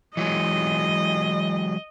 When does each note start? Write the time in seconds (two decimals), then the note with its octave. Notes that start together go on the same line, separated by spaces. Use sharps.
0.17 E3 F#3 G#3 D#5